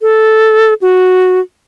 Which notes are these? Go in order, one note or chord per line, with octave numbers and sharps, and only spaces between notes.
A4
F#4